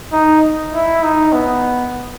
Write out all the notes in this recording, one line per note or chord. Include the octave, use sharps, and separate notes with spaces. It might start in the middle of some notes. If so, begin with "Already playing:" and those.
D#4
E4
D#4
B3